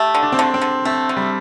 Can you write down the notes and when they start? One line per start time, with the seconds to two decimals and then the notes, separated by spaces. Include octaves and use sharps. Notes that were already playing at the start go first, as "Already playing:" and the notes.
Already playing: A3 G4
0.15 D3
0.23 D4
0.32 C4
0.39 D3 D4
0.54 C4
0.62 D3
0.85 A3 C4
1.09 D3
1.17 G3